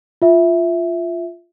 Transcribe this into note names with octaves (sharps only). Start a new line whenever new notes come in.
F4 E5